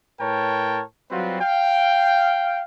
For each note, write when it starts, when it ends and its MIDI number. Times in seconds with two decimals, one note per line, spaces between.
0.20 0.82 45
0.20 0.82 70
0.20 0.82 71
0.20 0.82 73
0.20 0.82 79
0.20 0.82 81
1.11 1.40 54
1.11 1.40 55
1.11 1.40 60
1.11 1.40 65
1.11 1.40 66
1.11 1.40 71
1.41 2.63 77
1.41 2.63 79